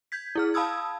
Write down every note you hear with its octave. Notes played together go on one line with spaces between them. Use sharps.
G6 G#6 B6
E4 G#4 F6
F5 A5 B5 D#6 E6 G#6